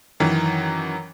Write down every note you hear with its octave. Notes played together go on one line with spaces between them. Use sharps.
F#2 D#3 E3